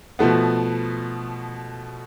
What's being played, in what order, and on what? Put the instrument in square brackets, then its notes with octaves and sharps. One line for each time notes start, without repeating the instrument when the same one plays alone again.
[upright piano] B2 F3 A3 B3